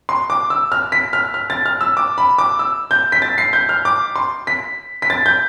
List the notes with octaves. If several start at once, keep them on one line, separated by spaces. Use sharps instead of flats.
C6
D6
E6
F6
B6
F6
F6
A6
F6
E6
D6
B5
D6
E6
G6
B6
A6
C7
G6
F6
D6
C6
B6
B6
A6
G6